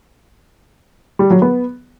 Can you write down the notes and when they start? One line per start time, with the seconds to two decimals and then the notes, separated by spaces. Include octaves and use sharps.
1.19 G3
1.31 F#3
1.42 B3